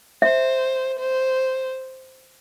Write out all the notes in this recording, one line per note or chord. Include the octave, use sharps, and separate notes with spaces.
C5 E5
C5